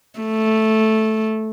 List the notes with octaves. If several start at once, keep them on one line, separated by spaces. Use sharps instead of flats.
A3